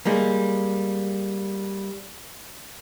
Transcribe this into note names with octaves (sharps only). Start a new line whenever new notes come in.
G3 G#3 A#3